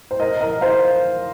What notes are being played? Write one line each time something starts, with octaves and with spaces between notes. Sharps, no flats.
C5
A#4 D#5
A#4 D#5
C5 F5